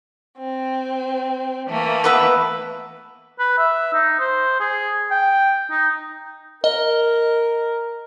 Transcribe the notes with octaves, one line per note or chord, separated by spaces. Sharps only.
C4
E3 A3 A#3
B3 B4 E5
B4
E5
D#4
C5
G#4
G5
D#4
A#4 D#5